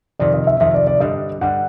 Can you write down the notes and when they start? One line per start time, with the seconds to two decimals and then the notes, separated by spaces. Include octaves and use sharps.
0.19 F2 C3 D#3 D5
0.34 D#5
0.47 E5
0.60 F2 C3 D#3 E5
0.74 D5
0.87 D5
1.00 G2 D3 G3 D#5
1.41 G2 D3 G3 F#5